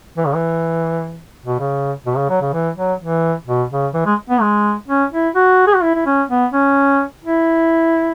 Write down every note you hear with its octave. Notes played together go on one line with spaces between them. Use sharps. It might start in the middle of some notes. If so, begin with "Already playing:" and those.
E3
C#3
E3
B2
C#3
B2
C#3
F#3
C#3
E3
F#3
E3
B2
C#3
E3
G#3
B3
G#3
C#4
E4
F#4
G#4
F#4
E4
E4
C#4
B3
C#4
E4